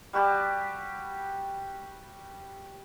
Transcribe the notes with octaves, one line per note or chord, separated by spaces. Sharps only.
G3 F#4 G4 A5